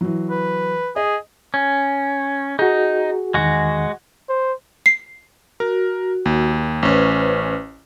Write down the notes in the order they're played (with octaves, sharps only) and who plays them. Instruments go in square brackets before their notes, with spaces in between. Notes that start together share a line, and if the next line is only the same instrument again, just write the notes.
[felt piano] E3 F#3
[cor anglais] B4
[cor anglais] G#4 [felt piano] D#5
[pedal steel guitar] C#4
[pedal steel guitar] D#4 [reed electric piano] F#4 G#4
[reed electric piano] E2 D#3 [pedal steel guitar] G#3 F#4
[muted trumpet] C5
[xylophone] C7
[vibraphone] F#4 [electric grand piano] A#4
[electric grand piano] D#2
[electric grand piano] A1 C#4 [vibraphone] B4 C5